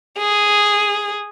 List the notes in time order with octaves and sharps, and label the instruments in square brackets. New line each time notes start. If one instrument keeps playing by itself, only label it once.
[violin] G#4